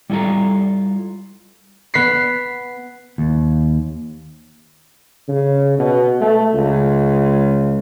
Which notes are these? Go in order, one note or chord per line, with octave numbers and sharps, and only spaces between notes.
G3 E4 F4 A4 A#5
B3 B6 C7
D#2
C#3
B2
A3
C#2